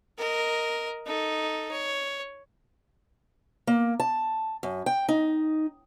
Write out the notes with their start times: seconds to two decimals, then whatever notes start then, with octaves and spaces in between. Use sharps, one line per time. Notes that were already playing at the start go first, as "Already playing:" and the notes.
0.18 A#4 D#5
1.06 D#4 A4
1.71 C#5
3.67 A#3
4.00 A5
4.63 F#2
4.86 G5
5.09 D#4